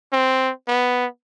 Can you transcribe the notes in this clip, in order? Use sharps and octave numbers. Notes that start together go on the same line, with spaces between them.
C4
B3